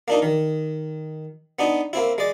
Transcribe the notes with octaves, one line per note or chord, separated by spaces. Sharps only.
A#3 D4 D#4
D#3
B3 D4 D#4
A#3 C4 E4
G#3 D5